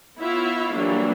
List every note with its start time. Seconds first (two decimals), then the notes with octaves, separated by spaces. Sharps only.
0.18 B3 E4 F4 C#5 E5 F5
0.73 E3 F#3 G3 A#3 D4